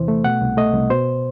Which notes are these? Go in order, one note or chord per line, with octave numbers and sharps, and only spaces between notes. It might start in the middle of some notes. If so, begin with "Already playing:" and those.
Already playing: E2 C3 E3 C5
A3
B2 F#5
C2
A3 D#5
C2
B2 C5